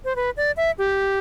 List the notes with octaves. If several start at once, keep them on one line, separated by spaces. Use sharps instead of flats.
C5
B4
D5
E5
G4